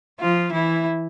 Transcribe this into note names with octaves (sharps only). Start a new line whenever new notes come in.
F3 F4
E3 E4